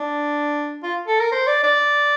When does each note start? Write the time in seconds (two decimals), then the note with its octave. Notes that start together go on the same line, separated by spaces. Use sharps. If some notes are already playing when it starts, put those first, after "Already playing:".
Already playing: D4
0.83 F4
1.07 A4
1.20 A#4
1.32 C5
1.47 D5
1.63 D5